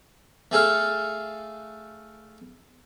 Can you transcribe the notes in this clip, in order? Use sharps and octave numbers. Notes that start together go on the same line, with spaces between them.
A3 G#4 A4 F5